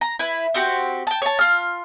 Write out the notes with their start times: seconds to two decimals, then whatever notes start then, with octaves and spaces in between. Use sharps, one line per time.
0.01 A#5
0.19 E4 B4
0.54 C4 F#4 G4
1.07 G5 A5
1.22 C#5 A5
1.39 F4 F6